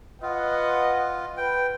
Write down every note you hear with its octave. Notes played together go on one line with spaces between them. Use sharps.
F4 B4 D#5 F#5
B4 G5